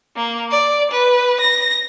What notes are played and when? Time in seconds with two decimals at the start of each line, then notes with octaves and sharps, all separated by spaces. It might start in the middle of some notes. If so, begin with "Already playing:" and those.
0.16 A#3
0.51 D5
0.91 B4
1.40 A#6